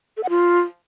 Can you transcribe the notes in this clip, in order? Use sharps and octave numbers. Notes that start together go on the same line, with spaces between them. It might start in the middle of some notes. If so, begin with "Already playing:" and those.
A4
F#5
F4